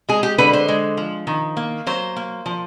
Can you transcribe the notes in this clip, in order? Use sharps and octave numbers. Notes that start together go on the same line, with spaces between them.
G#3 G#4
G4
D3 B4
C5
G#3
F3
D#3
A#3
F#3 C5
A#3
F3